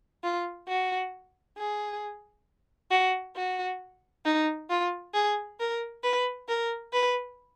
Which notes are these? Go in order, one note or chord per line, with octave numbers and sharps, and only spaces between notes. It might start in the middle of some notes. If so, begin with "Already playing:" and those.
F4
F#4
G#4
F#4
F#4
D#4
F4
G#4
A#4
B4
A#4
B4